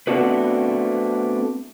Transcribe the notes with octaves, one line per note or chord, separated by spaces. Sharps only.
A3 B3 C4 D4 F#4 B4